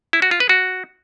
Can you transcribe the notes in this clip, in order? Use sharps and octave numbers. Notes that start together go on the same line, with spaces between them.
E4
F#4
F4
B4
F#4